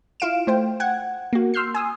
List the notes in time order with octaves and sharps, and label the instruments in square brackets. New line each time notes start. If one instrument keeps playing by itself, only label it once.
[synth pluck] E4 F4 F5 D7 E7
A3 C5 G5
F#5 G5 G#6
A#3 F#4
C6 E6 F6 G6 C7
G#5 D#6 E6